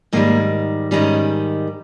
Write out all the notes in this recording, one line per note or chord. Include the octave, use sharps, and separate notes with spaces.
G#2 D#3 G3 A#3
G#2 D#3 G3 C#4